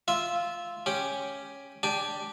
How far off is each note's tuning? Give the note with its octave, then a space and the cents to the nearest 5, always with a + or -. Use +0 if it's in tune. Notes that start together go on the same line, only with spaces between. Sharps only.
F4 -5 E5 -5
C#4 +0 G4 +0
D4 +0 G4 +0 G#5 +30